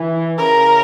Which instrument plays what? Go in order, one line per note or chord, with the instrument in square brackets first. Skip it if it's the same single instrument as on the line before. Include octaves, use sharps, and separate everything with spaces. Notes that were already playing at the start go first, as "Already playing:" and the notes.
Already playing: [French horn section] E3
[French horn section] C#3 [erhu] A#4